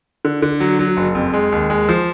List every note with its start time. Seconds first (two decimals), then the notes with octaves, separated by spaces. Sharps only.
0.25 D3
0.42 D3
0.60 F#3
0.79 F#3
0.97 F#1
1.15 F2
1.34 G#3
1.52 D#2
1.70 G#3
1.89 F3